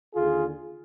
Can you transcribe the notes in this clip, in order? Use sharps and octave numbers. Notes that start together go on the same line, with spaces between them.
D#2 D3 F4 G#4